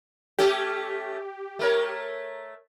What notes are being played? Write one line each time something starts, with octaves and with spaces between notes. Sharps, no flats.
A3 C#4 G4 A4
A3 A#4 C#5